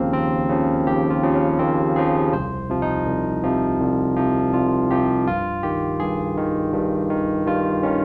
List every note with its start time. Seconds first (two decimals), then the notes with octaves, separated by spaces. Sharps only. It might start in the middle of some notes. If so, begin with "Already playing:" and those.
Already playing: D#2 C#3 F3 A#3 C4 A#4
0.12 D#2 C4
0.49 C#3 F3
0.87 D#2 G4
1.10 F4
1.23 C#3 F3
1.35 C#4
1.59 D#2 C4
1.96 C#3 F3 G#4
2.33 C2 C5
2.70 C3 F3
2.82 D#4
3.07 C2
3.44 C3 F3
3.80 C2
4.16 C3 F3
4.54 C2 F4
4.91 C3 F3 G4
5.27 G2 F4
5.63 D#3 G4
6.00 G2 G#4
6.37 D#3
6.73 G2
7.10 D#3
7.47 G2 F4
7.83 D#3 C#4